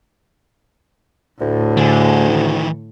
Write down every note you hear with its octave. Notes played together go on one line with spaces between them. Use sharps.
D2 A2
D3 A3 G#4
D#3 E3